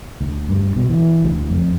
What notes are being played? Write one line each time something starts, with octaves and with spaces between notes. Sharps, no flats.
D2
G2
B2
E3
D2
F2